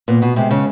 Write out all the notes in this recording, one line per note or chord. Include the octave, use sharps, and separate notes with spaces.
A#2 B3
B2
C3 G#3
C#3